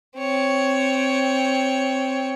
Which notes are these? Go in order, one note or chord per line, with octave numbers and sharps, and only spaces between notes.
C4 C#5